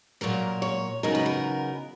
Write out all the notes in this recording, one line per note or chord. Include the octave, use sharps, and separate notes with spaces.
A#2 F#3 A#3 A#4
C#5
E2 C#3 F#3 B3 D#4 A#4
B4
A#4